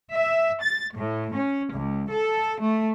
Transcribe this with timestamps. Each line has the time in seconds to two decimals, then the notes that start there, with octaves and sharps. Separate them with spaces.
0.12 E5
0.62 A6
0.96 A2
1.34 C#4
1.72 C#2
2.11 A4
2.59 A3